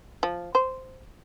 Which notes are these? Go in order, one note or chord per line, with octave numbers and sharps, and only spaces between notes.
F3
C5